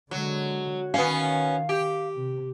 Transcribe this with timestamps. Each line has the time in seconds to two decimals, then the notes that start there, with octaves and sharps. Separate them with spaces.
0.11 D3 F#3 G#3
0.94 D#3 B3 C#4 F5
1.69 G4
2.15 C3